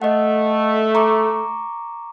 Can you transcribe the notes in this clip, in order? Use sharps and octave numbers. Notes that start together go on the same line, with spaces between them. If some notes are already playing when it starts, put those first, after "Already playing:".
A3 D#5 F#5
A#5 C#6 D6